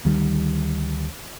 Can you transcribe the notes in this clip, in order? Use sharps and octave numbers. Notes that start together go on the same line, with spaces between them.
D2 D#3 G3